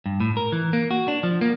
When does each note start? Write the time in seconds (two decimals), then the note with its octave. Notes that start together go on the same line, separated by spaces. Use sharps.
0.06 G2
0.20 A2
0.37 A#4
0.52 E3
0.73 A#3
0.91 F#4
1.08 D4
1.23 F3
1.41 A#3